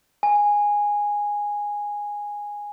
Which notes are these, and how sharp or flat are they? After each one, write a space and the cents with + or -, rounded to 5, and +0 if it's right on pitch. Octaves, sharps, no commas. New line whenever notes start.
G#5 -10